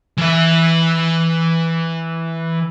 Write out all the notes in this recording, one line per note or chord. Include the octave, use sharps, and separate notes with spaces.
E3 E5